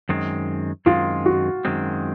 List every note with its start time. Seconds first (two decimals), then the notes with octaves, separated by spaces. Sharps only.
0.09 F#2 D#3 G#3 C4
0.86 F#2 D#3 G#3 C4 F4
1.26 F#4
1.65 F#2 D#3 G#3 C4